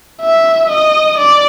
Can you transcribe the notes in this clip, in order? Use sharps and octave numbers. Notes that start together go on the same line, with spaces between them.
E5
D#5
D5